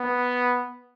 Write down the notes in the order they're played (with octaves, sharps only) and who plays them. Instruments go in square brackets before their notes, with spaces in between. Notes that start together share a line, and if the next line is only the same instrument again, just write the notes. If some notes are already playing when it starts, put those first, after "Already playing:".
Already playing: [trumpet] B3